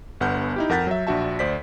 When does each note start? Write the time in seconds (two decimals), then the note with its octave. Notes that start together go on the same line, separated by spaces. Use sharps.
0.20 G1 G2 B3 F#5 F6 G6
0.56 D#4 E4 G4
0.69 F2 A#4 F#5 G6 A6 B6
0.87 F#3 E5
1.07 A#1 D4 F#4 E5 A5
1.39 D2 C5 D5 B6